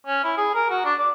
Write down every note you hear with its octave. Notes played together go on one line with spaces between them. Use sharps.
C#4
E4
G#4
A#4
F#4
D4
D5